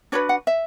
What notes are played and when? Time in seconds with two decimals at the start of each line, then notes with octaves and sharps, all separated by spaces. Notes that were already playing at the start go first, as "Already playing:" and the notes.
0.12 D4 F#4 B4 C#5
0.29 F#5
0.47 E5